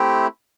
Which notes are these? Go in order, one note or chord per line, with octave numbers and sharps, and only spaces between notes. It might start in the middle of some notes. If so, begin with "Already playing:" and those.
Already playing: A3 C4 E4 G4